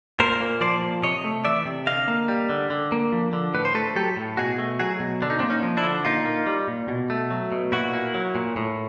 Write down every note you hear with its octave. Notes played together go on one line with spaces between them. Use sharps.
A#2 A#4 C5
A#3
F3 C5 D5
A#2
C3 C#5 D#5
A3
E3 D5 E5
C3
D3 D#5 F5
A#3
G3
D3
D3
A#3
F3
D3
A2 B4
C5
A3 A4 B4
F#3 G4 A4
A2
B2 F#4 G#4
A3
F#3 F#4 G#4
B2
D3 D4
D#4
A#3 C4 D4
C#4 D#4
F3
D4 E4
D3
A#2 D#4 F4
A#3
G3
A#2
B2
A3
F#3
B2
A#2 E4 F#4
A#3
F#3
A#2
A2